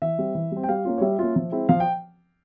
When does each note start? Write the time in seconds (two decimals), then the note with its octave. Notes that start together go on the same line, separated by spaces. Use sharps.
0.02 E3 E5
0.19 G3 C4
0.35 E3
0.52 G3 C4
0.63 G5
0.69 G3 F5
0.85 A#3 C#4 F4
0.98 C#5
1.01 G3 E5
1.19 A#3 C#4 F4
1.36 F3
1.52 G#3 C4 E4
1.69 F3 F5
1.80 G5